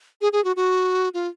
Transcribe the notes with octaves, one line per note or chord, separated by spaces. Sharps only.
G#4
G#4
F#4
F#4
F4